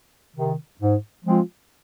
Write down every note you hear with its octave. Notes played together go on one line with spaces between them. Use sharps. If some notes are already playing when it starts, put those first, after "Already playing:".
C3 D#3
G#2
F3 G#3 C4 F4